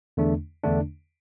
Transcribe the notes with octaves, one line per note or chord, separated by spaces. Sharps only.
E2 D3 A3 D4
E2 D3 A3 D4